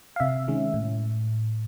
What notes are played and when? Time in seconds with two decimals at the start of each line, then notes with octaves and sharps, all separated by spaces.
0.16 F5
0.20 C3 E5
0.48 D#3 G#3 C#4
0.74 A2